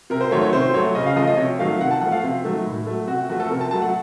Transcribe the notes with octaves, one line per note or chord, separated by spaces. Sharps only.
C3 A#4
C5
D#3 F#3 A3 C#5
C#5
C3 C5
F#3 A3 C#5
C#3 D#5
F5
F3 A3 D#5
D#5
C3 C#5
D#3 F#3 A3 F5
C3 F#5
A5
F3 A3 F#5
F5
C3
D#3 F#3 A3
A2
F#3 A3
C3 F#4
F3 A3 F#4
A4
C3 A#4
A5
F#3 A3 A5
F#5